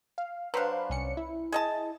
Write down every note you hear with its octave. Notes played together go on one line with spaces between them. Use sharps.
F5
F#3 D4 B4 C5 F5
C2 C#4 C#7
E4
G#4 D#5 A5